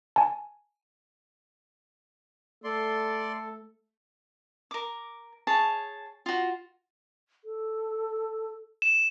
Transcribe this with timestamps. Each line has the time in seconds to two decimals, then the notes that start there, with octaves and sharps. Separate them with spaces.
0.16 G#5 A5
2.64 A3 A4 D5 C6
4.71 A#4 D6
5.47 G#4 C#5 A5
6.26 F4 F#4
7.45 A4
8.82 E7